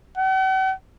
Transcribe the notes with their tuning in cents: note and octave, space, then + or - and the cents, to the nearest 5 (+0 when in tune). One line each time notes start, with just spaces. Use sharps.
F#5 +45